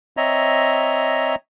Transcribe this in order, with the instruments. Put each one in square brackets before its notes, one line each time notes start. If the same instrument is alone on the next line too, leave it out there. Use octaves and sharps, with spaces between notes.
[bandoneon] C4 C#5 D#5 E5 A#5